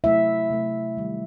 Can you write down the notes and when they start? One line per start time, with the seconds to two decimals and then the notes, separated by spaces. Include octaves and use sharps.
0.04 C3 F#3 A3 E4 E5
0.51 C3 F#3 A3
0.97 D#3 G3